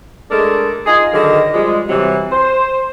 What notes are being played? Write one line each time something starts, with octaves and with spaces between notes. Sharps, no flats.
G#3 A3 D4 A4 A#4
D#4 F4 G#4
D3 D#3 F#3 G#4 A#4
F3 G3 G#3
C3 E3 F#3 G3 C4
C5